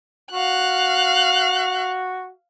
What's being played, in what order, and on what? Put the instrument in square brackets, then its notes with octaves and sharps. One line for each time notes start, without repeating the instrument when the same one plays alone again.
[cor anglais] F#4 [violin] F5 F#6